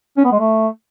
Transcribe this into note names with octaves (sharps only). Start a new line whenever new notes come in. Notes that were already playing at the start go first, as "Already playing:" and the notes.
C#4
B3
G#3
A3